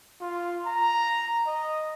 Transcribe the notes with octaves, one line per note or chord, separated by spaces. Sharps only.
F4
A#5
D#5